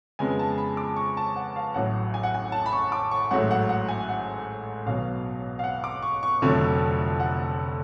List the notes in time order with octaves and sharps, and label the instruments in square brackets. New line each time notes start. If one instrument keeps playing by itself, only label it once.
[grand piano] F2 C#3 G#3 B3 G#5
A5
B5
D6
C#6
A5
F#5
F5
A1 A2 F#3 F#5
G#5
F#5
G#5
A5
B5
C#6
D6
C#6
A1 G#2 F#3 A3 F#5
F#5
F#5
G#5
F#5
B1 B2 F#3 B3 F5
F5
F#5
D6
C#6
C#6
F1 F2 D3 F#3 A3
F#5